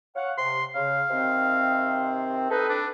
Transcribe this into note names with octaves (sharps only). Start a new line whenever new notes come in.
C#5 F5 F#5
C3 C6
C#3 F5
C3 D#3 C4
D#4 A4 B4
D4